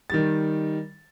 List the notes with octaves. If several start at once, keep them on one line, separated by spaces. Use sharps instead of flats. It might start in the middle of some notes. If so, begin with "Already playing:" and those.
D#3 G3 A6